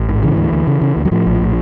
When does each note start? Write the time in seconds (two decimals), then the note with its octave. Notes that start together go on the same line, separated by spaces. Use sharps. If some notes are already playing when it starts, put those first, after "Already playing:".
Already playing: A1
0.09 G#2
0.23 C#3 E3
0.37 D2
0.52 D2
0.67 C#3
0.81 C#3
0.97 D2
1.05 F#3
1.11 A2 F3
1.26 A#1
1.41 A2